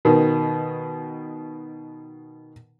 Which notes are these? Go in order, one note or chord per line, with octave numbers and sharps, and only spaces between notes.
B2 D#3